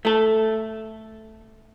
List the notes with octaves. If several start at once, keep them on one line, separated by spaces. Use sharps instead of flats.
A3 A4